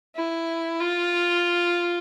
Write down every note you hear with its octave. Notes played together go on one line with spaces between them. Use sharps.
E4
F4